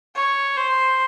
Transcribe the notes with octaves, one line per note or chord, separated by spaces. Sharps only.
C#5
C5